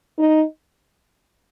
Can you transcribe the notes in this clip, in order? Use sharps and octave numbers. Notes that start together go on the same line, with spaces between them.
D#4